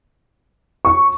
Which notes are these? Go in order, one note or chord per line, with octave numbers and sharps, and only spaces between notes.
C#6